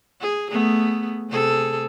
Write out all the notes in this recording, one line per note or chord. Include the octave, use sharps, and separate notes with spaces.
G#4
A3 B3 G#4
C3 G#4 A4